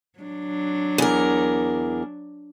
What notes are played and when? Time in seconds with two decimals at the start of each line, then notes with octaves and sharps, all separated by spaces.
0.19 F#3 D4
0.98 E2 A#4